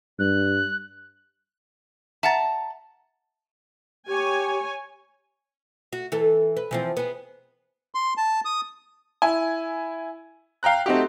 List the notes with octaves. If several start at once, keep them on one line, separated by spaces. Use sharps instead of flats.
G2 F#6
E5 F#5 A5 A#5 A6
G4 C#5 G#5
F#4
E3 A4
B4
E3 F3 C4
B3 G#4
C6
A5
D#6
E4 G#5
F5 G5 A#5 F#6
A3 C4 D#4 F#4 G4